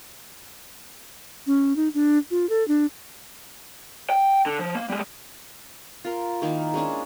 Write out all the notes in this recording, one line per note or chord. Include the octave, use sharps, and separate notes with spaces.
C#4
D#4
D4
F4
A4
D4
G5
D3
F3
A#3
G3 G#3
F4 A#4
D#3 A#3 D#4 E4
G#3 C#4 D4